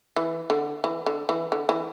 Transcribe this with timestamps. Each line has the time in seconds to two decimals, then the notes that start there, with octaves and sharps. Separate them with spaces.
0.16 E3
0.50 D3
0.84 E3
1.06 D3
1.29 E3
1.52 D3
1.69 E3